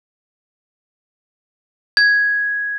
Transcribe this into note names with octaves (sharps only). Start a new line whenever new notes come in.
G#6